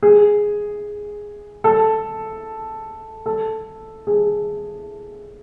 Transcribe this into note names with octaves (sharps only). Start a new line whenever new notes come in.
G#4
A4
A4
G#4